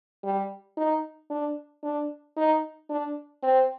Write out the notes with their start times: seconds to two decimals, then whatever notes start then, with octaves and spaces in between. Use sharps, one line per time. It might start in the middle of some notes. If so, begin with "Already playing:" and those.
0.24 G3
0.77 D#4
1.30 D4
1.84 D4
2.37 D#4
2.90 D4
3.43 C4